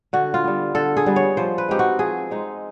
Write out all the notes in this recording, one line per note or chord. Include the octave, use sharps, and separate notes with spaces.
D3 F#4
F4
G3 B3
D3 A4
G#4
G3 B3
C#5
F3 C5
B4
G#3 C4 D#4 G4
F#4
F3 G#4
G#3 C4 D#4